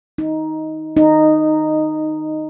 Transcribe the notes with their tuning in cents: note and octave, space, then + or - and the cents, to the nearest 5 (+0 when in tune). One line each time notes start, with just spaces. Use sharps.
D#4 +10
D#4 -10